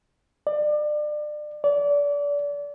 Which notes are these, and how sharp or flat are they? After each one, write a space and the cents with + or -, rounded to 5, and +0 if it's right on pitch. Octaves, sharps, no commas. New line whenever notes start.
D5 +30
D5 -30